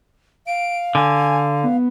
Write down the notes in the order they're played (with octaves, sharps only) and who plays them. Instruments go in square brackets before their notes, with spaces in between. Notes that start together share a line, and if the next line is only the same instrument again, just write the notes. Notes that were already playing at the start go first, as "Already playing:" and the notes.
[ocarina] F5 [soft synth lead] D7
[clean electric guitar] D3 [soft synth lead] G#5
[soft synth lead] B3